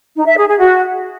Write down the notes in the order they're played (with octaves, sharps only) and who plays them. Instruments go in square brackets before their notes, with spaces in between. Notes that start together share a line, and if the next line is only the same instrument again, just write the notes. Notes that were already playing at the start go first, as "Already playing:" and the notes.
[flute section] D#4
E5
G#4
G#4
F#4